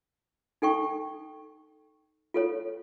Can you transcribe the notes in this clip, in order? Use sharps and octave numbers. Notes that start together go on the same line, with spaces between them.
D#4 A4 G5 C#6
F4 A4 C#5